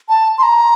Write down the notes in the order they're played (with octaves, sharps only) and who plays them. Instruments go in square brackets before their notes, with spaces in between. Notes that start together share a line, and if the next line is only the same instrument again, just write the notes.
[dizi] A5
C6
A#5